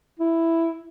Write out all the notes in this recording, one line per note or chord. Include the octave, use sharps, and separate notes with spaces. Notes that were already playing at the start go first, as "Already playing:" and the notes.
E4